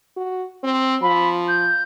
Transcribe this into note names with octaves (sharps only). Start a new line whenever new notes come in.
F#4
C4
F3 B5
G6